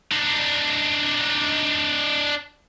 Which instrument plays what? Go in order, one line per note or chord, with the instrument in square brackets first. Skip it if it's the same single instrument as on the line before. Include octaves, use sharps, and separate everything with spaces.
[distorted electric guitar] D4 D#4